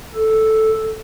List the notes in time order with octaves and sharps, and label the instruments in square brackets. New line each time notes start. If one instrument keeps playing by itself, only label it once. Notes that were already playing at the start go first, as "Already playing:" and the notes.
[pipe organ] A4